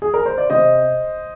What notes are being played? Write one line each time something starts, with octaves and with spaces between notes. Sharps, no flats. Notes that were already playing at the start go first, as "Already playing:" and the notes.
G#4
A#4
C5
D5
C3 C5 D#5